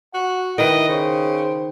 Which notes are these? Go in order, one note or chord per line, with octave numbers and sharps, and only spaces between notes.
F#4 F#5
D#3 E4 B4 D#5
C#3 C5